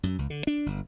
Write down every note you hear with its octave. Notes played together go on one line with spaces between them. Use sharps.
F#2
C#2
D3
D4
G1